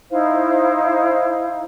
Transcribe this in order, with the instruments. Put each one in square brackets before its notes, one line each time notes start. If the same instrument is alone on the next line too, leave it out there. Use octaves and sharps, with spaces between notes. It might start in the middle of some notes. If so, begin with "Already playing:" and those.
[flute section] D#4 E4 C5 F5